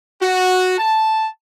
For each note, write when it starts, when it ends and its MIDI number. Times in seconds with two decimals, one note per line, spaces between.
0.21 0.77 66
0.78 1.26 81